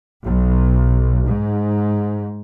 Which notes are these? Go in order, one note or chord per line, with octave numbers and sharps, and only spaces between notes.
B1
G#2